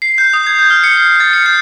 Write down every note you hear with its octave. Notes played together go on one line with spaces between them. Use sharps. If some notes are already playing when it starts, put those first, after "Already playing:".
C7
G6
D#6
G#6
G6
F6
C#7
C7
A6
C#7
G6